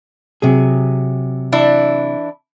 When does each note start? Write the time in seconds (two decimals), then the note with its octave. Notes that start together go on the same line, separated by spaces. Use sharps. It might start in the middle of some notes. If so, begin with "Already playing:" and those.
0.42 C3 F#3 G#4
1.52 E3 D4 E4